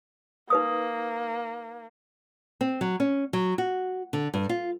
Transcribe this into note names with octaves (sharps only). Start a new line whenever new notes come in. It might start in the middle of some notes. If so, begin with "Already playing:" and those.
A#3 D#4 B4 D#6
C4
F#3
C#4
F#3
F#4
D3
G2
F4